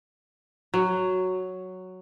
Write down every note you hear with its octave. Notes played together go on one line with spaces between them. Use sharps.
F#3